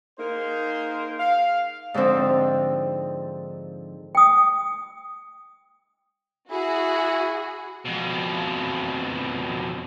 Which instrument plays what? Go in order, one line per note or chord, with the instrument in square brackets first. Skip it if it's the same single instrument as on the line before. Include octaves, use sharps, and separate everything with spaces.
[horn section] A#3 D#4 G#4 A#4 C5
F5
[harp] G#2 D3 F3 C4 D#4
[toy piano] G5 D#6
[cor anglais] E4 [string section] F#4 G#4
[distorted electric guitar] F2 B2